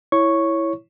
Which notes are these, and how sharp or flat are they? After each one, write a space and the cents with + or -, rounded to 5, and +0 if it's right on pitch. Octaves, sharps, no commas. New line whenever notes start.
E4 +0 C#5 +0 C#6 -5